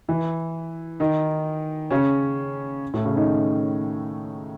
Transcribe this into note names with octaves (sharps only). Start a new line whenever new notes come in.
E3 E4
D#3 D#4
C#3 C#4
A2 A3
C#3 C#4
D#3 D#4